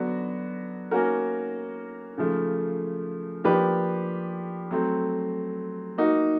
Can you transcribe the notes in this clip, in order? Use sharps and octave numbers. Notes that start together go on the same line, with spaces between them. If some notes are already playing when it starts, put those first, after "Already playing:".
Already playing: D3 F#3 B3 D4 F#4
A#3 C#4 F#4 A#4
C#3 F3 A3
F3 A#3 D4 G4 B4
F#3 A3 C4
A#3 D#4 F#4